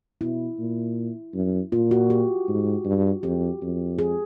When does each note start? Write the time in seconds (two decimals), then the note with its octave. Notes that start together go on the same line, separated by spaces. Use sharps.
0.21 B2 E4
0.59 A#2
1.34 F#2
1.72 A#2 F4
1.91 F#4
2.10 G4
2.48 G#2
2.85 G2
3.23 F2 G4
3.62 F2
3.99 G#4